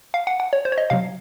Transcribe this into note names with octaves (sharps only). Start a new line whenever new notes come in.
F5
F#5
F#5
C#5
C5
C#5
D#5
C3 F#3 F5